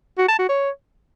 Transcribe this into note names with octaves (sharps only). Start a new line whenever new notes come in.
F#4
A5
F#4
C#5